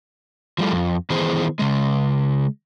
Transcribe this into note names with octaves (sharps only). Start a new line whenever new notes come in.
F3 G3 A3
F2
D#3 E3 B3 E4 G#4 C5
C#3 G#3